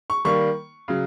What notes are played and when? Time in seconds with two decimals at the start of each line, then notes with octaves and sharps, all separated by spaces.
0.10 C#6
0.25 D#3 G3 A#3 C#6
0.88 C#3 F#3